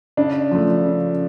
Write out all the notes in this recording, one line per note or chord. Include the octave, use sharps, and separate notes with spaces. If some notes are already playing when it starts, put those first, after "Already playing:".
C#3 D4
F3 A3
C#3